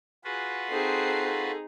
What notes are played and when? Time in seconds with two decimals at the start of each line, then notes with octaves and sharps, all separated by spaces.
0.24 F4 F#4 G#4 B4
0.69 C4 D#4 G#4 A4 C7